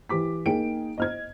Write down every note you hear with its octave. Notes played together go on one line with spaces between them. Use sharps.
E3 G4 D6 B6
A#3 D#4 G#4 G5 D7
D#5 F6 G#6